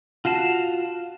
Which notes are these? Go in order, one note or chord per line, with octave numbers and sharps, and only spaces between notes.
F4 F#4 F5 A5